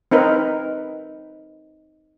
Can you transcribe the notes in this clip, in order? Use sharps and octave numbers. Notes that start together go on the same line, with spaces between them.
C4 D#4 A#4 B4